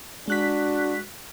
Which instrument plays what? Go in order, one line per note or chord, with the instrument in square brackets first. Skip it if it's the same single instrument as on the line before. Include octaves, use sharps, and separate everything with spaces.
[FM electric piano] G#3 F#6 B6 [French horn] D4 [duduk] F#4